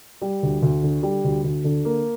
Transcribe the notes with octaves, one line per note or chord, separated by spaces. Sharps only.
G3
D2
D2
D3
G3
D2
D2
D3
A#3